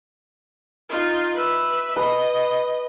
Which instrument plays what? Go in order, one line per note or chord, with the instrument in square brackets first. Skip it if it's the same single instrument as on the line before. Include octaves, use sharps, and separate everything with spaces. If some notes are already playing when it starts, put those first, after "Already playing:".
[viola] D#4 F4
B4 E5
[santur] B4 [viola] D#5